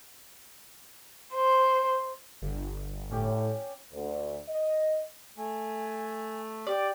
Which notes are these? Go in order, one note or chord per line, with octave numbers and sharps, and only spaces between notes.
C5
G1
A2 C#4 G4 D5
D2
D#5
A3 G#5
G4 D5